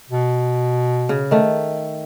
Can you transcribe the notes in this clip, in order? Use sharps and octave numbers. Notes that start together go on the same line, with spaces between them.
B2
C#3
D#3 A3